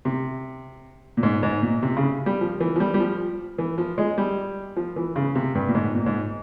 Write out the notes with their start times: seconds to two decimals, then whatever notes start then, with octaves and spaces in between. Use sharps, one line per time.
0.05 C3
1.17 A#2
1.23 G#2
1.43 G#2
1.62 A#2
1.82 C3
1.97 C#3
2.26 G3
2.41 F3
2.60 E3
2.76 F3
2.80 G3
2.94 G3
3.00 F3
3.58 E3
3.78 F3
3.98 G#3
4.18 G3
4.76 F3
4.96 E3
5.16 C#3
5.35 C3
5.55 G2
5.68 A#2
5.75 G#2
5.95 A#2
6.06 G#2